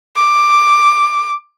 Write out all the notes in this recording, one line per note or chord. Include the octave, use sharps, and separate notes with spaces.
D6